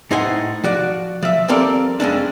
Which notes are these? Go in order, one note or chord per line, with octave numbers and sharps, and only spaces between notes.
A2 D#4 C5 F#5 G#5
F3 F#4 D5
F3 E5
F3 G3 C4 A4 A#4 D5
F2 G#3 C#4 D4